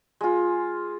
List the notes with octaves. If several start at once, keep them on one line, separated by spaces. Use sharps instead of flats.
G#3 F4